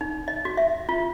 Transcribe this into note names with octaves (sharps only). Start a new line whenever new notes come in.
D#4
D#5
F#4
E5
F4